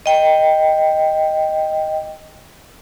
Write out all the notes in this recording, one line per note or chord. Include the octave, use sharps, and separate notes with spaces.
D#5 G5